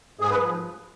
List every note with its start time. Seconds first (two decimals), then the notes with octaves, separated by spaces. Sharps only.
0.20 G#2 G#4
0.30 B4
0.41 F3